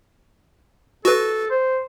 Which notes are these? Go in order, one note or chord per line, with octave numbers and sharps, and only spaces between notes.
F#4 A4 B4
C5